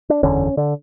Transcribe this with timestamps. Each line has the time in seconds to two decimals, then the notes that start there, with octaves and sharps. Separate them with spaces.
0.10 D4
0.23 F#1 E2 D3 C#4
0.57 D3